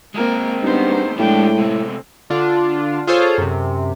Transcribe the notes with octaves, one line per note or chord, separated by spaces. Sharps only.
G#3 A#3 C4 A#4
G2 A#3 B3 D#4 C5
A2 F3 G#3 D4 G4 G5
C3 A3 C4
D3 D4 F4
F4 G#4 A4 C5 C#5
F#2 C3